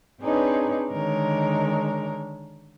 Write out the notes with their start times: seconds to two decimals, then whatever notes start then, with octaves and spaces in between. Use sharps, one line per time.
0.21 C4 D4 D#4 G#4 B4 C#5
0.90 D3 D#3 G#3 A#4 C#5